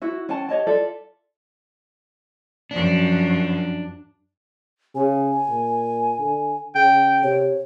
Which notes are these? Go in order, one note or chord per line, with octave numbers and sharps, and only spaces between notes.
E4 F#4 E5
C#4 F#5 G5 A5
G4 C#5 D#5 A5
F4 A4 D5 E5
F#2 F3 D4
C#3 G#5
A#2
D3
C#3 G5
C3 C#5